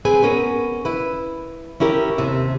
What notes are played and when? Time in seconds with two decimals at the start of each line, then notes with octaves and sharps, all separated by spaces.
0.05 C4 G#4 B4 G#5
0.23 B3 C#4 A#4
0.85 E4 B4
1.80 C#4 E4 G4 A#4
2.18 D#2 C3 E5